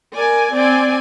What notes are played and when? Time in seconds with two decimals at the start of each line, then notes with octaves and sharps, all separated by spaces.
0.16 A#4 D5 G#5
0.54 C4 D5 G#5